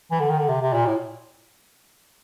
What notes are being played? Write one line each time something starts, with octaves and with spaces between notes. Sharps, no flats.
E3
D3
D#3
D3
C3
C3
A#2
A2